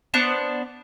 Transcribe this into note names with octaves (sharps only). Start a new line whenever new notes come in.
B3 D4 C5